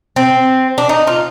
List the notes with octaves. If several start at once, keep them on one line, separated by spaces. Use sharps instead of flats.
C4
D4
D#4
F4